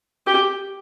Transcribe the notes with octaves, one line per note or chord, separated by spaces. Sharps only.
G4